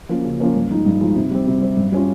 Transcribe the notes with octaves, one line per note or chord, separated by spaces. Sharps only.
F3 A#3 C#4
C#3
F3 A#3 C#4
G2
F3 G#3 D#4
G2
F3 G#3 D#4
C3
G3 C4
C3
G3 C4
G2
G3 C#4 F4